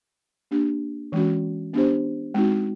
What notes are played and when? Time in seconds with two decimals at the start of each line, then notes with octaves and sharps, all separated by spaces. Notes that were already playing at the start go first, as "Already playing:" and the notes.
0.51 A#3 D4 G4
1.12 E3 G#3 C#4 F#4
1.73 B3 D4 G4 C5
2.34 G#3 C4 D#4 F#4